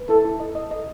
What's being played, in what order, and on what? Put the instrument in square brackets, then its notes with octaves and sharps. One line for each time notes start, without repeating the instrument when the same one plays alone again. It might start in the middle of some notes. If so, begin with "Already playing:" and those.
Already playing: [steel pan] B4
[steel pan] E4 [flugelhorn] A4
[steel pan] E4
D#5
D#5
D#5